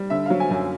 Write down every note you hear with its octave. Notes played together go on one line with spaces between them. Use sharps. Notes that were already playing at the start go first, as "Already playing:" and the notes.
Already playing: G3
D3 E5
F#3 F5
G#5
F#2